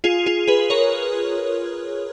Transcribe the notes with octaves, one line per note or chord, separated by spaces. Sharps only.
F4 G#4
F4 G#4
G#4 B4
A#4 C#5